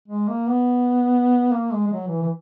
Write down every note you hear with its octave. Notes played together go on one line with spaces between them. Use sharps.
G#3
A#3
B3
A#3
G#3
G#3
F#3
E3
E3